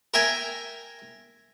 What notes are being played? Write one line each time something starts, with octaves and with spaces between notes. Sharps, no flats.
A#4 E5 G5 G#5 A#5